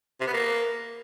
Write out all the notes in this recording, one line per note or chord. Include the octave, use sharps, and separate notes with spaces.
C3
B3
A#3